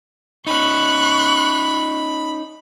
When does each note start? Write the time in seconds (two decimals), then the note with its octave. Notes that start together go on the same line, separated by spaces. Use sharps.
0.47 C#4 D#4 B5 C#6 F#6